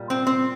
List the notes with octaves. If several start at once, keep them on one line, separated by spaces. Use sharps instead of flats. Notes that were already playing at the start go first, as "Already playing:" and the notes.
Already playing: A#2 G3
C4
C4